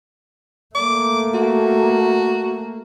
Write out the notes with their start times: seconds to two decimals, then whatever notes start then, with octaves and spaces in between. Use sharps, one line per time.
0.75 A3 A#3 D6
1.34 F#4